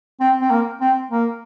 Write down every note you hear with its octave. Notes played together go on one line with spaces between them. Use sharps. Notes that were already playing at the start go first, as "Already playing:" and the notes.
C4
C4
A#3
C4
A#3